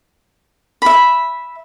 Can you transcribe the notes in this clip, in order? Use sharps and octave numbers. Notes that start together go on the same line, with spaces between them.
E5 B5